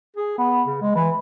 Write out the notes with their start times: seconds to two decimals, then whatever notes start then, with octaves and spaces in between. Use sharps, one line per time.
0.17 G#4
0.38 B3
0.67 C#3
0.82 G#3
0.95 E3